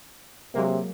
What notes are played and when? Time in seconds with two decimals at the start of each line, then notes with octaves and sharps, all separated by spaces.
0.54 C3 F#3 G#3 A#3